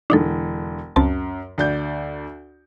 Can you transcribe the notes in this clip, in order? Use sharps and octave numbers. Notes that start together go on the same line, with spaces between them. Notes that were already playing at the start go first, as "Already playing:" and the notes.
E1 D3 E3 D4 D#4 A4
C#2 F#2 C4 A5
D2 D5 G6